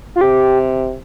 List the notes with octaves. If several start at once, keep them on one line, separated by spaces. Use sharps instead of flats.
F4
C3 G4